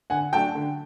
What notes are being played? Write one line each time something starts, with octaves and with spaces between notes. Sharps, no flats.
D3 F#5 G#5
F#3 A3 D4 G5 A5
D3